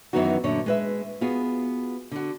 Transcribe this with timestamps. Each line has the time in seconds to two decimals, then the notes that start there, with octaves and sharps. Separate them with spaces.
0.13 F#2 D#3 E3 B3 D#4 F#4
0.44 F#2 A#2 D3 C#5
0.66 G#3 B4 E5
1.21 B3 F4 F#4 G#4
2.12 D3 F#4